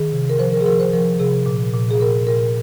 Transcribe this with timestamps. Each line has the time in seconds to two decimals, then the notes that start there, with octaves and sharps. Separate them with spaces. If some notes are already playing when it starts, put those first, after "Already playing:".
Already playing: D#3 G#4
0.12 C3
0.29 A#4
0.39 F3 C5
0.53 A#4
0.61 G#4
0.66 F3 A#4
0.80 C5
0.93 F3 A#4
1.20 C3 G#4
1.46 A#2
1.74 A#2
1.91 G#4
2.00 A#2 A#4
2.27 A#2 A#4